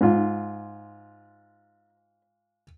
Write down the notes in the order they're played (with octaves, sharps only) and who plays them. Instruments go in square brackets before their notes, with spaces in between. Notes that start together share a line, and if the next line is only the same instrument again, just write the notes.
[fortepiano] G#2 F4